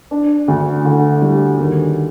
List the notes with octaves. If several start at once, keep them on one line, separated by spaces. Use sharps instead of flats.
D4
D2
D3
G3
D#2